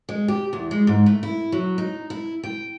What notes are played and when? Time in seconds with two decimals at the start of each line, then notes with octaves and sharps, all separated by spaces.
0.09 G#3
0.28 G4
0.53 E2
0.71 G#3
0.87 G#2
1.06 A3
1.23 E4
1.52 F#3
1.78 D#4
2.10 E4
2.43 G5